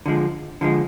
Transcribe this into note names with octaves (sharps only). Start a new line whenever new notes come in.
D3 F3 G#3
D3 F3 G#3